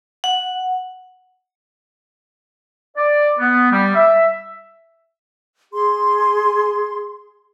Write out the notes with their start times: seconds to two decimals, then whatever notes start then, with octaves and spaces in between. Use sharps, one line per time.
0.24 F#5
2.96 D5
3.39 B3
3.72 G3
3.95 E5
5.73 G#4 C6